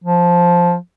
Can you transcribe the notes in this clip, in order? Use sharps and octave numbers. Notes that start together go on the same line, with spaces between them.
F3